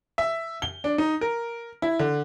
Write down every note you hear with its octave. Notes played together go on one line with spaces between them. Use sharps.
E5
G7
D4
D#4
A#4
E4
D3